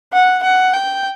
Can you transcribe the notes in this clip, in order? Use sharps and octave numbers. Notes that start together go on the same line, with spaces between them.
F#5
F#5
G5